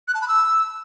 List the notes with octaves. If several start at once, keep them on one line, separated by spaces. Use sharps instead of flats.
F#6
A5
B5
E6